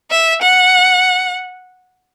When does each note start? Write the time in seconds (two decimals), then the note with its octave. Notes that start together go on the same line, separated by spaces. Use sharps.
0.11 E5
0.42 F#5